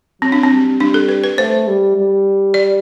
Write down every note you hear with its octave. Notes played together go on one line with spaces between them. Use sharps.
F#3 C4
D4
C4
G3
G3 D4
A4
B4
B4
A3 C5
G3
G3
D5